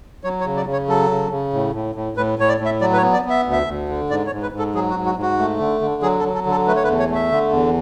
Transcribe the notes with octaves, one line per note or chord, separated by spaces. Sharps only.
F#3 C#5
C#5
C#3
D5
C#3
C#5
F#3 A4
C#3
C#3
A2
A2
A2
A2 B4
A2 C#5
D5
A2
E5
F#3 D5
B4
C#5
B3
D5
B3
E5
D2
E5
D2
D3
G#2 D5
C#5
G#2
B4
G#2
A4
F#3 G#4
F#4
G#2
F#4
G#2
F#4
A3
D3
D3
F#3 G#4
A4
F#3
A4
D3
A4
A3 B4
C#5
B4
E2
C#5
A3 E5
D3
E2